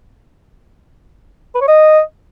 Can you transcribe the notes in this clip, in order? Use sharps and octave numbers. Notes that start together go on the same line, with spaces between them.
B4
C#5
D#5